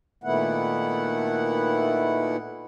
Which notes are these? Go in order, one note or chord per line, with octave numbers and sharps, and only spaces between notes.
A#2 D#3 A3 B3 E4 F#5